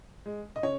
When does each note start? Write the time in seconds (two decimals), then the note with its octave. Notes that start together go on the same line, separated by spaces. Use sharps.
0.26 G#3
0.56 D#5
0.63 C#3 C#5